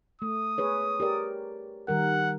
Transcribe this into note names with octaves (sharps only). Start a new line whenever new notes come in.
A3 D#6
G#4 B4 C#5
G4 A#4 D5
D#3 G3 A#4 F#5